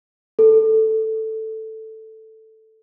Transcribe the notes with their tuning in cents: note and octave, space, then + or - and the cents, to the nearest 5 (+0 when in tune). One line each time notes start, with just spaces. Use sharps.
A4 +5